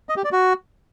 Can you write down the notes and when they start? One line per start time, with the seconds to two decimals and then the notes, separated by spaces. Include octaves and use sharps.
0.09 D#5
0.17 G4
0.24 D5
0.32 F#4